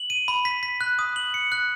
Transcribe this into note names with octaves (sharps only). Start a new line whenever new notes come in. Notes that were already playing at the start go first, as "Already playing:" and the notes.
Already playing: F#7
D#7
B5
B6
B6
F#6
D#6
F#7
C#7
F#6